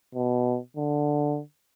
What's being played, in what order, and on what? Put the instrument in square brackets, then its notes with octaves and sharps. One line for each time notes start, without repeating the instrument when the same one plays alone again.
[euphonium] B2
D3